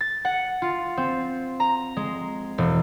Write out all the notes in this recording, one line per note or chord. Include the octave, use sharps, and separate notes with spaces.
A6
F#5
F4
C4
A#5
G#3
E1